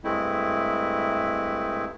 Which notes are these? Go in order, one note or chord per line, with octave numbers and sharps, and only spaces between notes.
G2 G#3 A3 C4 E4